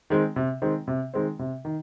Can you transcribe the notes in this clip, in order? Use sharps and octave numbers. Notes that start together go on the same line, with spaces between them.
D#3 G#3 C4
C3
D#3 G#3 C4
C3
D#3 G#3 C4
C3
D#3